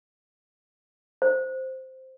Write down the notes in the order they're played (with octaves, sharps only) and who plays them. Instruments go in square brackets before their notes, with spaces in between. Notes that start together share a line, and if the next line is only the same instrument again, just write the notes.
[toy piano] C5